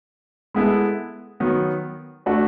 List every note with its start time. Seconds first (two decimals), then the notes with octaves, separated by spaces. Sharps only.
0.54 G#3 B3 E4 A4
1.40 D#3 F#3 B3
2.26 A3 D4 F#4